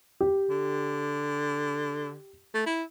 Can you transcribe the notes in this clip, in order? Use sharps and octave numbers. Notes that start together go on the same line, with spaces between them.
G4
D3
A3
E4